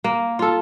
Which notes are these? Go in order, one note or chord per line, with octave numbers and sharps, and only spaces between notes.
A#3
F4 A4